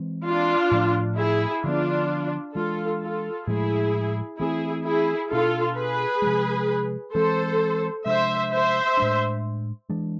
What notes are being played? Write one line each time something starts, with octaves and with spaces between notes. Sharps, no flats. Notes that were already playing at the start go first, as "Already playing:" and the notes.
Already playing: E3 G#3 C4
D4 F4
A2 F3 A3
E4 G#4
D3 F3 B3 D4 F4
E3 G#3 D4 F4 A4
F4 A4
A2 F3 G#3 E4 G#4
E3 A3 C4 E4 G#4
E4 G#4
B2 B3 D4 F4 A4
G#4 B4
C3 F3 G#3
E3 G#3 C4 A4 C5
C3 F3 G#3 D4 C5 E5
C5 E5
A2 G#3 D4
E3 G#3 D4